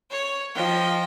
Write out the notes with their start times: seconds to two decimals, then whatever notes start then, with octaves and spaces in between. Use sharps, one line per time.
0.11 C#5
0.55 F3 D#5 G5